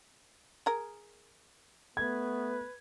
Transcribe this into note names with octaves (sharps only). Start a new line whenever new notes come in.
G#4 A#4
A3 B3 B4 G#6